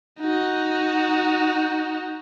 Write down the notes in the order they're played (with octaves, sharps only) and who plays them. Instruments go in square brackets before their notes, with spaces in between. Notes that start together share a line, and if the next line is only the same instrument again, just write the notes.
[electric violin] D#4 F#4